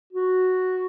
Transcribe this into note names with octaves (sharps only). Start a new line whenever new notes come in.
F#4